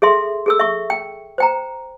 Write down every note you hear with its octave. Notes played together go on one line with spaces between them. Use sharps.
G#4 A4 E5 C6
G#4 A4 E6
E5 C#6
G5
C5 G5 A#5